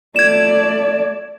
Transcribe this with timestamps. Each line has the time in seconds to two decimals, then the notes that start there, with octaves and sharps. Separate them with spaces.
0.16 A3 D5 G#6 E7